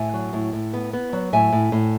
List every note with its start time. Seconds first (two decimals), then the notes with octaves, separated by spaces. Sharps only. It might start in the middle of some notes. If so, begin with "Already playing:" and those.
Already playing: A2 E5 G#5
0.14 F#3
0.33 A2
0.53 A2
0.73 B3
0.93 B3
1.13 F#3
1.33 A2 E5 G#5
1.52 A2
1.72 A2